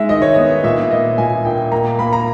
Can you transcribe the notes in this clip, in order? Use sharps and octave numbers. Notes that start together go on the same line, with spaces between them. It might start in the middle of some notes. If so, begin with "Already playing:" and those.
Already playing: G#3 D#4 E5
D#3 D#5
C#5
B3 D#5
A#2 E5
A#3 D#5
A#2 G#5
E5
A#2 G5
A#3 A#5
A#3 B5
A#5